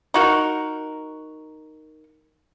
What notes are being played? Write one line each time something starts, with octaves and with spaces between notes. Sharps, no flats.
D#4 F#4 A#4